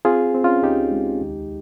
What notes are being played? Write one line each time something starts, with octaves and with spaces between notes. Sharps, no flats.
C4 F4 G#4
C4
C#4 F4
C#2 D#4 G4
G#3
D#2